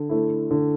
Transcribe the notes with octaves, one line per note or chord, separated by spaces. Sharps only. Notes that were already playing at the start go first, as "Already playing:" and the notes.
Already playing: D3
A3 E4
D3